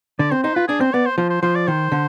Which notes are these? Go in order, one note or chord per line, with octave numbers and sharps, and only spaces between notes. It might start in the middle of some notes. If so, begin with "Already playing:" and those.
D3 D5
C4 C5
D#4 C5
F4 B4
D4 G#4
C4 C5
B3 D5
C5
F3 C5
C5
F3 C5
D5
D#3 C5
D3